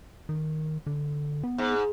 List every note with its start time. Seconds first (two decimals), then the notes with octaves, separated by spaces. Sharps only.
0.29 D#3
0.86 D3
1.43 B3
1.58 G#2